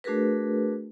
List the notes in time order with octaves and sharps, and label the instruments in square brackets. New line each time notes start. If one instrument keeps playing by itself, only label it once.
[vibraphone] A3 D4 F#4 G#4 A#4 B4